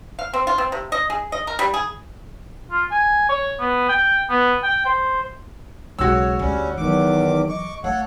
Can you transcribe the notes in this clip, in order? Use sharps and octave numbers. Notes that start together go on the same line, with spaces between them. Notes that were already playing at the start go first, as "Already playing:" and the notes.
F5
C4
F4
C4
C3
D#5
G#4
D#5
A#4
G3
G#4
F4
G#5
C#5
B3
G5
B3
G5
C5
B1 C#3 G#3 F#4 C#5 E6
D2 G3 C#4
E2 D#3 E3 F#3 D6
D#5 C#6 D6
A3 A4 C#5 F5 F#5